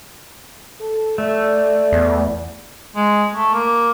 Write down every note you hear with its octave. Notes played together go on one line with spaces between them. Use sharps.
A4
A3 D5
E2
G#3
A3
A#3